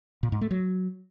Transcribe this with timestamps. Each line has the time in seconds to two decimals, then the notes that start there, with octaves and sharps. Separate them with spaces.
0.23 A#2
0.32 G#2
0.41 A3
0.51 F#3